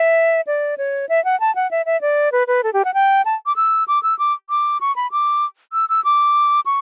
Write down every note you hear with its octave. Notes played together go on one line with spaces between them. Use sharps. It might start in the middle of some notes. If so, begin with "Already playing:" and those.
Already playing: E5
D5
C#5
E5
F#5
A5
F#5
E5
E5
D5
B4
B4
A4
G4
F#5
G5
A5
D6
E6
D6
E6
D6
D6
C#6
B5
D6
E6
E6
D6
C#6